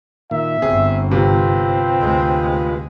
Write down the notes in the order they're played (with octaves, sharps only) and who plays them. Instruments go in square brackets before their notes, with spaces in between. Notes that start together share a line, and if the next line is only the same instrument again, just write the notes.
[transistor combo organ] A#2 D#3 [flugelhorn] E5
[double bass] G1 [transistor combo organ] C4 [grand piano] G#4
[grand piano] C3 [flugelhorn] C4 [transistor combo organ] F4 B4
[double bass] D2 G#3